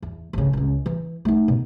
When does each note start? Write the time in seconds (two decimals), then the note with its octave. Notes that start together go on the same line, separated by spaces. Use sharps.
0.02 E2
0.33 A1 C#3
0.53 C#2 C#4
0.86 E3
1.25 A3 D#4
1.48 B2